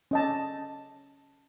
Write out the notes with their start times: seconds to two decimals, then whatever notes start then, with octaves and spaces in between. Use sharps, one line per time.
0.11 C#4 D#5 A5